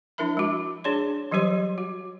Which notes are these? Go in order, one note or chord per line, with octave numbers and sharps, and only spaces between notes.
F3 D4 E4 A#4 E5 B5
G#3 F#4
D4 G#4 C#5 D5 C6
E3 F#3 G3 G4 C#5 C6
F#4